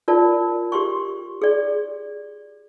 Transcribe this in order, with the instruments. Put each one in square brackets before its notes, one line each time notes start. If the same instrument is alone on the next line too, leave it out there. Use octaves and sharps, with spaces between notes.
[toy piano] F4 A#4 D5 A5
G4 C6 C#6
G#4 D5